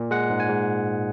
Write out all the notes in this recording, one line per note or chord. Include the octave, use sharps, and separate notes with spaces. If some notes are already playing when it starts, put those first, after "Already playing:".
Already playing: A#2
G#3 F#5
G#2
G#5
G#2